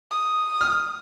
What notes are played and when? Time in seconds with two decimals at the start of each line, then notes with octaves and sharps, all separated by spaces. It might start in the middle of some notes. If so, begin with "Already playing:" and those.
0.11 D#6
0.61 F6